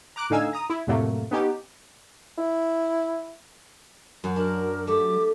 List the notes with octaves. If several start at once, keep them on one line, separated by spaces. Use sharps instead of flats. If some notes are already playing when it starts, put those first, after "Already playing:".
A#5 D6 F#6 D7
A2 D3 D#4 F5 G#5 E6
A#5 D#6
E4
F2 A2 C3 F#3 A3 A#3
B3 C#4 D#4 G4
E4
F#2 F#3
D4 A#4
A3 G4 D6